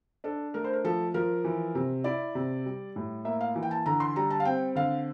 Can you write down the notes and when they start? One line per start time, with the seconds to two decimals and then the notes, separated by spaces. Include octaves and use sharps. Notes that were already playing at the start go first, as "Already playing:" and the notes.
0.24 D4 A4
0.54 A3 A#4
0.64 C5
0.73 A#4
0.84 F3 A4
1.14 F3 A#4
1.45 E3
1.75 C3
2.04 E4 D5
2.35 C3
2.66 G3
2.96 A2
3.25 A#3 E5
3.41 F5
3.56 E3
3.63 G5
3.71 A5
3.86 D3 A#5
4.00 C6
4.16 G3 A#5
4.30 A5
4.40 F5
4.45 C4 G5
4.76 D3 F5